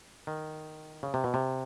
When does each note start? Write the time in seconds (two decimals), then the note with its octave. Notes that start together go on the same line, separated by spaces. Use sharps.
0.27 D#3
1.03 C#3
1.14 C3
1.24 B2
1.34 C3